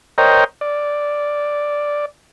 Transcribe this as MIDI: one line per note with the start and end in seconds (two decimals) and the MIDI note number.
0.18 0.44 70
0.18 0.44 72
0.18 0.44 73
0.18 0.44 75
0.18 0.44 79
0.18 0.44 82
0.61 2.05 74